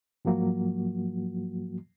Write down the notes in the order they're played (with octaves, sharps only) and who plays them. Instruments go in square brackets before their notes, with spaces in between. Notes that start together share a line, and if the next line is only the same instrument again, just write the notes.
[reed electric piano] G#2 F3 F#3 A#3 F#4